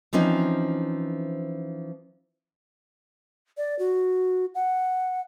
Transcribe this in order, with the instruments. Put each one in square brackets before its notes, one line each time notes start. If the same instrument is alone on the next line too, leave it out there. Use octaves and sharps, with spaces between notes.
[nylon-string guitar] E3 F3 C4 C#4 D#4
[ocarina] D5
F#4
F#5